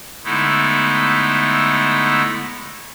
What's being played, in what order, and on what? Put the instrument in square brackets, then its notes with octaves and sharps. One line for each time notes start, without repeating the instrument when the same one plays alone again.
[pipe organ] D3 G#3 A3 B3 D#4 E4